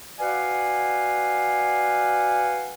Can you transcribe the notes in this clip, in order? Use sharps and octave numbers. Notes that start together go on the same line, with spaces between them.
F#4 B4 D5 F5 F#5 G#5